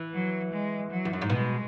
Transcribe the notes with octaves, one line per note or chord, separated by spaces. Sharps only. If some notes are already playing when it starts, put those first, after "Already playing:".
Already playing: E3
F#3
G#3
F#3
E2
F#2
G#2
B2 G#3